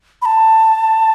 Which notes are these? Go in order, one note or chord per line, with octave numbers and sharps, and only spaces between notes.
B5
A5